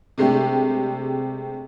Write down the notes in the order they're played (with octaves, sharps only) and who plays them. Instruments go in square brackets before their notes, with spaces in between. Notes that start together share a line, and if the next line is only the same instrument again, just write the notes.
[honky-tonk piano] C3 G#3 A3 D4 G4